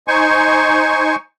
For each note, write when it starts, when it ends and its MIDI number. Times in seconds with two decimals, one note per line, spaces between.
0.08 1.16 63
0.08 1.16 72
0.08 1.16 80
0.08 1.16 85